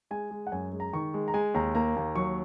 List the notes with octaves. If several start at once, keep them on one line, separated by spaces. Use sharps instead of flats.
G#3 G#5
G#3
F#5
F#2 G#5
G#3
A#5
D#3 C#6
G#3
A#5
G#3 G#5
D#2 A#5
A#3 A#5
D#2
F#3 C#6